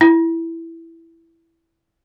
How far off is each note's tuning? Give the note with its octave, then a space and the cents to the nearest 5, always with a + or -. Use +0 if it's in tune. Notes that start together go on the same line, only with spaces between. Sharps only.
E4 +5